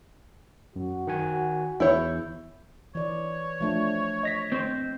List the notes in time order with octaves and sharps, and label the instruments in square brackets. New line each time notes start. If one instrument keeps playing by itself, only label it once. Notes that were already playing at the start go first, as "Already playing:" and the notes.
[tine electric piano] F#2 [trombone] F#4
[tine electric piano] D#3 F#5 G#5
[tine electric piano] E2 G6 [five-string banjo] E4 C#5
[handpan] E3 D5 [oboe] C#5
[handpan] F3 A3 D4
[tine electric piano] D#5 A#6 B6
[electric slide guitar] C4 C5